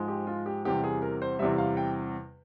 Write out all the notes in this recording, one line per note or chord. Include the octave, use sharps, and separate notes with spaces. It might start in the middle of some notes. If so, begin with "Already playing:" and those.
Already playing: G#2 F3 G#3
G4
F4
G4
E2 C3 G3 G4
G#4
A#4
C5
E2 C3 G3 E5
F5
G5